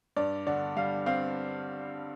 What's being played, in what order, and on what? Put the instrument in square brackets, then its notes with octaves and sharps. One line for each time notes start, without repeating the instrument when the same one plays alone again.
[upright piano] G2 D5
D3 D5
G3 F5
C4 F5